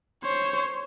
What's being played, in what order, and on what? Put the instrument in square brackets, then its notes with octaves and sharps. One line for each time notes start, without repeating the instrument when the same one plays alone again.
[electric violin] C5 [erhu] C#5